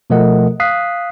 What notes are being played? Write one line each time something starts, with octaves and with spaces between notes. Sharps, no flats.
B2 F3 A3 A#4 D#5 F#5
F5 D#6 F#6 B6 C7